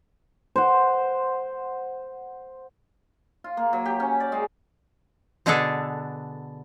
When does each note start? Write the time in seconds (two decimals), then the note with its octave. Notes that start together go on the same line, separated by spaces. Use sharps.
0.56 C5 F#5
3.44 F4
3.57 A#3
3.73 F#3
3.85 G4
4.00 C#4
4.20 D5
4.32 G#3
5.46 B2 D3 B3 D4 G#4 A4